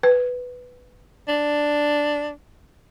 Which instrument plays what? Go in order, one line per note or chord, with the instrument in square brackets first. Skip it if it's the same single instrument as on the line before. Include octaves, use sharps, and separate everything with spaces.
[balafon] B4
[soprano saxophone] D4